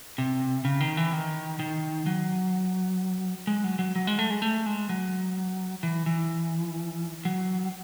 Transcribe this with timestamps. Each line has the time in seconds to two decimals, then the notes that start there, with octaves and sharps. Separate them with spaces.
0.18 C3
0.65 C#3
0.80 D#3
0.97 E3
1.13 D#3
1.59 D#3
2.06 F#3
3.47 G#3
3.64 F#3
3.79 F#3
3.96 F#3
4.07 G#3
4.19 A3
4.30 G#3
4.42 A3
4.66 G#3
4.89 F#3
5.83 E3
6.06 E3
7.25 F#3